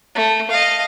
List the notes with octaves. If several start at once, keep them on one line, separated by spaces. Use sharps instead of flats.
A3
D#5 F5